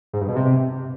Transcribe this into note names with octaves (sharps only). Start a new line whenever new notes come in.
G#2
G2
B2
C3